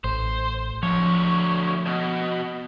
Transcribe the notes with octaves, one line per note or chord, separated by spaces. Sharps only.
A1 C5
D2 F3 C#5
B2